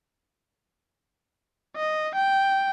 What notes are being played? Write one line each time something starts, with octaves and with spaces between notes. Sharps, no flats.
D#5
G5